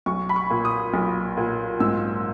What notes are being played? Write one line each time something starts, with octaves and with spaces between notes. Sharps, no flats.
B1 C#6
B5
C#6
A#2
D#6
B1
A#2
G#2 E6